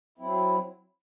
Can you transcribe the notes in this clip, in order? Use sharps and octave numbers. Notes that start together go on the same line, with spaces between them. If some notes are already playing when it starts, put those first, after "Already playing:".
F#3 C4 E4